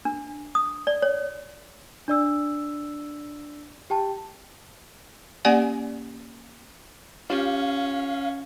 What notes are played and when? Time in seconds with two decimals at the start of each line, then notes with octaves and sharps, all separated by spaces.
0.05 D4
0.55 D#6
0.87 D5
1.02 C#5
2.08 D4 D5 E6
3.90 G4 G5 A5
5.45 A#3 C#4 G4 D5 F#5 G#5
7.30 C#4 F4 G4 F5